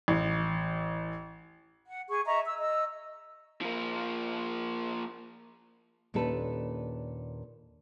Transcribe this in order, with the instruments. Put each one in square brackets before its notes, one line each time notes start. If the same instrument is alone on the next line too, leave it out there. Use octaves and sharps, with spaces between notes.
[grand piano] A1
[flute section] F#5
G#4 C#6
D#5 E5 A#5 C#6
E6
D#5 E6
[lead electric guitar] F3 A#3
[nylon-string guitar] D#2 A#2 C#4 D4 A4 B4